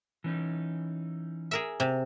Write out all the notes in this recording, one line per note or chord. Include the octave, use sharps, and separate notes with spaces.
E3 C#4 D#4
G#4 A#4 E5
C3